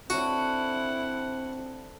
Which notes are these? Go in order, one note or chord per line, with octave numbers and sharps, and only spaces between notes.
C4 D4 E4 F#4 A4 D5 F#5